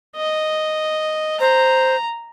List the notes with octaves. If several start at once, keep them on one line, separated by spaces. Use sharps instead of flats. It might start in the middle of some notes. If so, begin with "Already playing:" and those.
D#5
C5 A#5